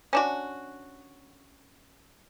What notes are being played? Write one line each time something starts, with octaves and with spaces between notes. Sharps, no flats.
C#4 D4 F#4